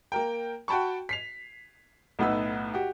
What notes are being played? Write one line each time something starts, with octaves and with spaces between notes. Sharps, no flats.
A#3 A#4 G5
F#4 G5 A5 B5 C#6
B6 C7 F7
B1 A2 B3 D#4 B4 E6
F#4 G4